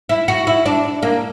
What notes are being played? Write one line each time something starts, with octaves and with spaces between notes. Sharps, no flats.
E4
F#4
E4
D4
A#3